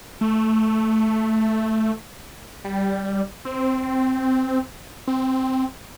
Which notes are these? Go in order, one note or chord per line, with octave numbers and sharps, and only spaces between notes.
A3
G3
C4
C4